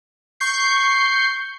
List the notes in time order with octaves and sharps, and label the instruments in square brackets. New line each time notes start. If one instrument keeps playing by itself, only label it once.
[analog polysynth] C#6 G6 C7